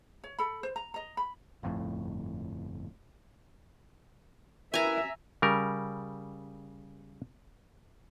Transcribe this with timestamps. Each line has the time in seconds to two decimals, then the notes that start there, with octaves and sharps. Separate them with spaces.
0.24 C#5
0.38 A4 B5
0.63 C5
0.76 A#5
0.94 D#5 A#5
1.17 B5
1.63 G1 F2 A2
4.74 E4 A#4 B4 E5 G#5 A#5
5.42 C#3 G3 A#4